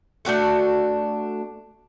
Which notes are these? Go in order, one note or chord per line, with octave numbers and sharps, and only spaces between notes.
A3 D4 F#4 A4